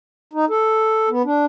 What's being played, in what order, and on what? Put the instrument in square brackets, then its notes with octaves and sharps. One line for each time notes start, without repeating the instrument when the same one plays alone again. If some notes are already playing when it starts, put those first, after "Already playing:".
[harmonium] D#4
A4
B3
D4